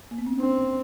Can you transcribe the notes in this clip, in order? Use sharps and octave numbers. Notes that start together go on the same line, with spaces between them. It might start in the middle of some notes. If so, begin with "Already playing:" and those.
A#3
B3
C4
C#4
C4 D4